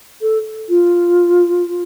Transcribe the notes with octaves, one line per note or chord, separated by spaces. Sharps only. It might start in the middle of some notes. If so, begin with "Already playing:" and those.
A4
F4